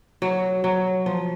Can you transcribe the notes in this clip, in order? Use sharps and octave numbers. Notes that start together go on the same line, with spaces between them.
F#3
F#3
F3